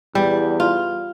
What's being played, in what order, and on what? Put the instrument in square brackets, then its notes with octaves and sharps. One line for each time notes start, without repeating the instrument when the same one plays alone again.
[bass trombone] E2 [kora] G3
[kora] F4